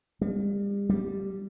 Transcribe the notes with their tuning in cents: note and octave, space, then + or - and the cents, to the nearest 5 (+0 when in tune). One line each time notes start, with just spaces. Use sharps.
G3 +40
G3 -5